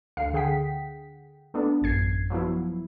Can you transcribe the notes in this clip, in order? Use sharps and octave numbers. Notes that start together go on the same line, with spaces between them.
D2 F5 C7
D3 G#4 F#5 G5 B6
A3 B3 D4
A1 F#2 G#6 C7
F3 F#3 B3 E4